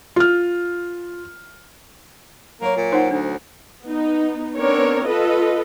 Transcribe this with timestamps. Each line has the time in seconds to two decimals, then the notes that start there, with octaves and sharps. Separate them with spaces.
0.16 F4 F6
2.61 F#3 A#3 A#4 C#5
2.76 A#2
2.92 D#4 C5 F#5
3.11 D2 D4
3.85 B3 D#4
4.57 B3 C4 D4 A#4 C#5
5.06 F4 A4 B4 D#5